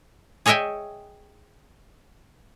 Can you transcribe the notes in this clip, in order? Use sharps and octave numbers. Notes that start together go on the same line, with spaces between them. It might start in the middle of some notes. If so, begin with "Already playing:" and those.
G#4 C#5 D#5 E5 G5 G#5